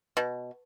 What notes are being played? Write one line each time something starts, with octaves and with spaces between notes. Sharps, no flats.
B2